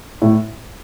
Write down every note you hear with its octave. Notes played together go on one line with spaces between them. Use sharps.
A2